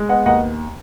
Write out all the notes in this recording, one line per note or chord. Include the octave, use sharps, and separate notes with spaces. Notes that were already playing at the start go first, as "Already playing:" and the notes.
Already playing: G#3
B3 D#5 F#5
D#2 D#5 F#5